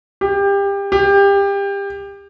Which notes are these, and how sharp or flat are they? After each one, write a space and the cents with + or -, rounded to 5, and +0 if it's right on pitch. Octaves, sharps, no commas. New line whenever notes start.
G4 +25
G4 +25